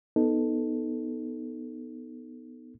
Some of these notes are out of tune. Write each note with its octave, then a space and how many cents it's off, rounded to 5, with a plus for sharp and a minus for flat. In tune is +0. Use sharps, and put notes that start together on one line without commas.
B3 +0 D#4 +0 A4 +0